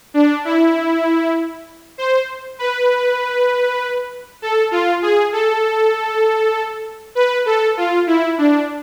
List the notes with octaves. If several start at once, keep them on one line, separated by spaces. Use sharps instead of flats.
D4
E4
C5
B4
A4
F4
G#4
A4
B4
A4
F4
E4
D4